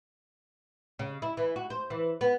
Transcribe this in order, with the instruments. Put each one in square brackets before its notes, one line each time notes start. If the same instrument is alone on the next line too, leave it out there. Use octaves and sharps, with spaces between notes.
[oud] C#3
E4
E3
F#4
C5
E3
B3